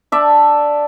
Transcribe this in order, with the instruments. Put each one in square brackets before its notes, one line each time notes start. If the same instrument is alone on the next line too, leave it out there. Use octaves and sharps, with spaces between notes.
[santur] D4 D5 E5